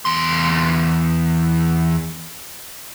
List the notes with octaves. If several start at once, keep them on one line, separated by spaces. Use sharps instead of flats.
E2 C6